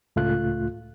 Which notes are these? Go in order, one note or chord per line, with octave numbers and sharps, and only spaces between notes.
C#2 A2 A3 F4 F#6